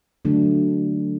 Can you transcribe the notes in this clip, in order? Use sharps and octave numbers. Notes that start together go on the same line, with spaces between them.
D3 F#3 A3 D4